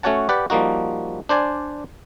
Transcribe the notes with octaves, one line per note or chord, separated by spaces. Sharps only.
A3 C#4 F#4 C#5 F#5 A5
G4 B4 D5 F#5
F3 G3 A#3 D#4 F#4
D4 C5 D5 G#5